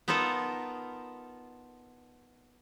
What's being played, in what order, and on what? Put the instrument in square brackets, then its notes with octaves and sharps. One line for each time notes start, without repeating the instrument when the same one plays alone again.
[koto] B3 D#4 F4 A4 A#4